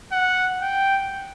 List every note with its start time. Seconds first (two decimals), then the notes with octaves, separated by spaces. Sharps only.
0.12 F#5
0.62 G5